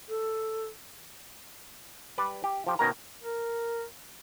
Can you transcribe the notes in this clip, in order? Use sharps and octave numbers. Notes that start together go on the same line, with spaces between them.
A4
G3 B4 D5
G4
F3 G4
B2 D#3 C#4 A#4 A#5
A#4